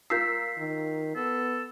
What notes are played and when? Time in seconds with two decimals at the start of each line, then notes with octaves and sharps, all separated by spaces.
0.10 F4 A#4 E6 G6 B6 C7
0.58 D#3
1.16 B3 A4